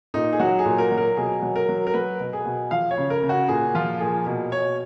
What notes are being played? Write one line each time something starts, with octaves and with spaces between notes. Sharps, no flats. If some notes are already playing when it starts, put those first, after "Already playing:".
A#2 D#4
G#4
F#3 F#4
G#4
A#2
A#4
F#3
A#4
B2 G#4
F#3
A#4
F#3
A#4
F#3 B4
B2
G#4
B2
F3 F5
C#5
C#3
A#4
C#3
F#4
A#2 G#4
F3 F4
A#2 G#4
B2
B2 C#5